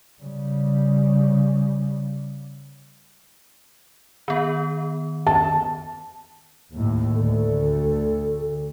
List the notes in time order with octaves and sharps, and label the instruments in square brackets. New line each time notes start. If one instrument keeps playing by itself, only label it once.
[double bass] C#3 G3
[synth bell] D#3 B3
[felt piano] A5
[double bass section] D#2 A2
[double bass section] D2 [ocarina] A4